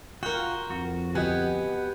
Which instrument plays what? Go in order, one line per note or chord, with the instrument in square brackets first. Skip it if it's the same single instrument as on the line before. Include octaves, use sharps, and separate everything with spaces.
[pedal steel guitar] F4 F#4 [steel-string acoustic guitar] A#4 G5
[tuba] F2 [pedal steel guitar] F#4 [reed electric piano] C#6
[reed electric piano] D2 F#4 D#5 [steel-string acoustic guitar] B3 [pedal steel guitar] G4 F#5 G#5